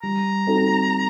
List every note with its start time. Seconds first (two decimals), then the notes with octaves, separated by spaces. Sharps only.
0.03 G3 A#5
0.47 C4 D#4 F#4 A4